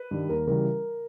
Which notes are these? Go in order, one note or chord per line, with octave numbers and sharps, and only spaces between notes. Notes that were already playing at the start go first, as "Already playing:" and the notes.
Already playing: B4
G2 D#3 G3
D#2 A#4
C#3 E3 G3 A#4